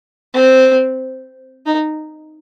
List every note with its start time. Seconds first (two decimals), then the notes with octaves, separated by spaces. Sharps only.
0.34 C4
1.66 D#4